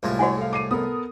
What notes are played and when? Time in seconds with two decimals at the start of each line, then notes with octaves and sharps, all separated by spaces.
0.03 C2 A2 G#3 F4
0.19 E4 F#4 C#5 F#5 G#5
0.37 A4 F5
0.53 D6 C7 D#7
0.71 B3 A4 A#4 D#6